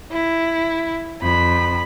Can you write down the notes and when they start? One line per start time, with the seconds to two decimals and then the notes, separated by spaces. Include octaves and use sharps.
0.12 E4
1.23 F2 B5